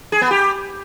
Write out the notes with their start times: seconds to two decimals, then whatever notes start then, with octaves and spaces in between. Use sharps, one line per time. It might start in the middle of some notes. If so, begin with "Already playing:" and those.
0.12 G#4
0.21 B3
0.31 G4